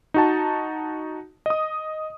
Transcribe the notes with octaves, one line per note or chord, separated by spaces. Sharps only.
D#4 F#4 A5
D#5 D#6